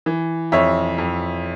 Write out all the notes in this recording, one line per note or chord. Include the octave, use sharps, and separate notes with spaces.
E3
F2 C#5 E5
F2